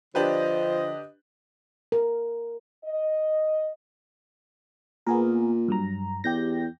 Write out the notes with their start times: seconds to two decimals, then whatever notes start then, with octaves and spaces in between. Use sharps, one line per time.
0.15 D3 F3 D4 G4 B4 D#5
1.92 A#4
2.85 D#5
5.07 A#2 B3 G#4 A#4
5.68 G2 F#3 A#5
6.24 E2 G4 G6 A#6